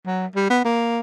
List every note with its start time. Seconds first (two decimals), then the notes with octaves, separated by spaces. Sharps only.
0.06 F#3
0.35 G3
0.50 B3
0.65 A#3